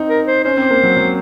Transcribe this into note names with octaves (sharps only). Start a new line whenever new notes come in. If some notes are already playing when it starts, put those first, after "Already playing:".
Already playing: C4 D#4
A#4
C5
C#4 C5
C4
A#3
F#3
F#3